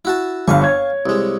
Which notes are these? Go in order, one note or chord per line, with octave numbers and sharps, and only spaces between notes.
E4 F#4 A5
G1 G2 F5 G#5 C#6
C#5 G#6
C2 G#3